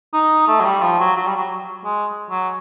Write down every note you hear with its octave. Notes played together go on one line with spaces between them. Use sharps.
D#4
A3
F#3
G3
F3
F#3
F#3
G3
F#3
G#3
F#3